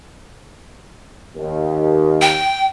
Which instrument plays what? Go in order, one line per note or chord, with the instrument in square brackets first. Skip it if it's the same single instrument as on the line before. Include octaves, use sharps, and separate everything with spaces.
[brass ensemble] D#2
[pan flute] G5